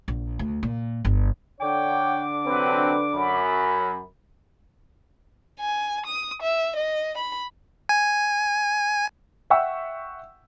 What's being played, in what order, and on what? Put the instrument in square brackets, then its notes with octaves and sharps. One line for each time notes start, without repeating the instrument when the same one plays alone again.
[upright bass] A#1
D2
A#2
G1
[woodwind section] D3 D4 D6 [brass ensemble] C#5 F#5 G5
[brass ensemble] C3 F#3 C4 [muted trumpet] B4
[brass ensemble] F#2 [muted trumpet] B5
[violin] G#5
D#6
E5
D#5
B5
[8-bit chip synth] G#5
[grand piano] E5 F#5 G5 C#6 E6